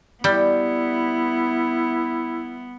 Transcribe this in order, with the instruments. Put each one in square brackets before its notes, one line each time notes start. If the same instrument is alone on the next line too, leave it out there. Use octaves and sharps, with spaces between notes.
[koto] G3 [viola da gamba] B3 [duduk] E4